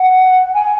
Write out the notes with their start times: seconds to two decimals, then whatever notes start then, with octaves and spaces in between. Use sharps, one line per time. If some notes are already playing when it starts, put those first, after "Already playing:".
Already playing: F#5
0.54 G#5